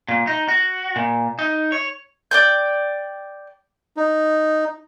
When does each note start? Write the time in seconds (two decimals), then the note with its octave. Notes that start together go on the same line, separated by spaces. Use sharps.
0.08 A#2
0.27 D#4
0.48 F#4
0.96 A#2
1.39 D#4
1.72 C#5
2.31 D5 G5 G6
3.97 D#4